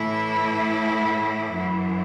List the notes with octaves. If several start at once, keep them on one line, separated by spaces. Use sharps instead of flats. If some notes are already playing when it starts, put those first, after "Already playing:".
Already playing: A2 E3 E4
F#2 E3